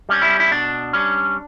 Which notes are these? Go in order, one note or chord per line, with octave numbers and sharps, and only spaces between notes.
G3 C#4
E4
E4
B2 D4
G3 C#4